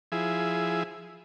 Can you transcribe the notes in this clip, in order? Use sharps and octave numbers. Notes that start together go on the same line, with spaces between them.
F3 E4 G#4